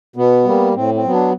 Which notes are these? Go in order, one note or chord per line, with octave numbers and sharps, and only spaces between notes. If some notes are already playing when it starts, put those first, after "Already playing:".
B2 B3
G3 A#3
A2 C4
C4
F#3 B3
D4